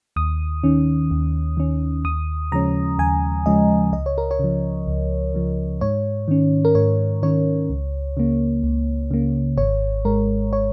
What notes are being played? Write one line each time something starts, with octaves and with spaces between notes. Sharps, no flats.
D#2 D#6
D#3 C#4
D#2
D#3 C#4
D#2 D#6
C#3 F3 G#3 C#4 A#5
D#2 G#5
C#3 F3 G#3 C#4 D#5
C#2 D#5
C#5
A#4
C#5
C#3 F3
C#2
C#3 F3
G#2 C#5
D#3 C#4
A#4
G#2 C#5
D#3 C#4 C#5
C#2
C#3 A#3
C#2
C#3 A#3
G#1 C#5
G#2 G#3 A#4
C#5